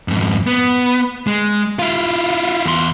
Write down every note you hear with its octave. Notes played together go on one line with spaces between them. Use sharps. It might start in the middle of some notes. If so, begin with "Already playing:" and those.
F2 G#2
B3
G#3
E4 F4
E2 C6